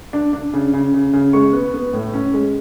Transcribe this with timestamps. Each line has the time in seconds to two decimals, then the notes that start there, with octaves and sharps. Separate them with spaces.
0.13 D4
0.33 D4
0.53 C#3
0.73 C#3
0.94 C#3
1.13 C#3
1.33 G#3 C#6
1.53 B3
1.74 B3
1.93 A2
2.13 C#4
2.34 G#3